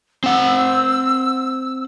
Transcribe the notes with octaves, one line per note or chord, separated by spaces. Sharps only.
C4 F#5 E6